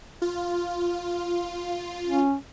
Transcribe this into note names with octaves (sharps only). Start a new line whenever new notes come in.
F4
C#4